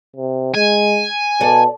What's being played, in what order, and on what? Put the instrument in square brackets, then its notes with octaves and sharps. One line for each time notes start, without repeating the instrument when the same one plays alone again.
[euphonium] C3
[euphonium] G#3 [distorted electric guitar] G#5
[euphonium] B2 [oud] A4 D5